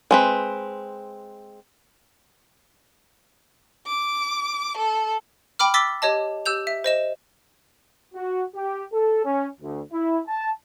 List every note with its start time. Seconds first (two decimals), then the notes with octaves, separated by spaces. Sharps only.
0.11 G#3 C4 B4
3.87 D6
4.77 A4
5.59 G5 B5 D6 F6
5.74 D6 E6 A6 B6 G7
6.02 G4 C#5 D#5 A5
6.46 G4 E6 G6 F7
6.67 E5
6.84 C5 D#5 E7
8.14 F#4
8.55 G4
8.93 A4
9.25 C#4
9.62 D2
9.93 E4
10.28 A5